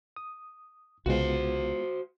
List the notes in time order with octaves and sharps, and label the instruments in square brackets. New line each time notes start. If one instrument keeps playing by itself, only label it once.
[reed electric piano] D#6
[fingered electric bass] C2 C#3 [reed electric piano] G#3 B3 F4 [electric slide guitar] F#4 C5